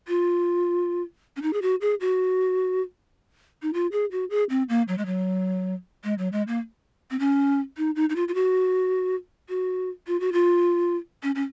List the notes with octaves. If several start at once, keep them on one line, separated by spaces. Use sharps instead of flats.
F4
C#4
D#4
G#4
F#4
G#4
F#4
D#4
F4
G#4
F#4
G#4
C4
A#3
F#3
G#3
F#3
G#3
F#3
G#3
A#3
C4
C#4
D#4
D#4
D#4
F4
F4
F#4
F#4
F4
F#4
F4
C#4
C#4